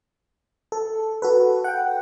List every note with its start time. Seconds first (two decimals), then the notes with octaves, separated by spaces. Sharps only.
0.72 A4
1.22 F#4 A4 B4
1.64 F#5 G5